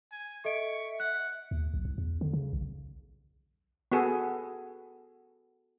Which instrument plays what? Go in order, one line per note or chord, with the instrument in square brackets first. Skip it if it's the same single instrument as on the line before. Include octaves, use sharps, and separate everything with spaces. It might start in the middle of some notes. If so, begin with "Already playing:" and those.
[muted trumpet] G#5
[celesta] A4 D#5 D7 [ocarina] E5 [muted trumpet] C#6
[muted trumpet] F#5 [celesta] F#6
[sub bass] D#2
B1
C2
E2
D3
C#3
B1
[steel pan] B3 F#4 G#4 A4